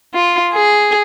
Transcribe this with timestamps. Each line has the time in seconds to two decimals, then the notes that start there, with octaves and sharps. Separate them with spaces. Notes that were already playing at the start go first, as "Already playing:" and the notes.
0.14 F4
0.53 G#4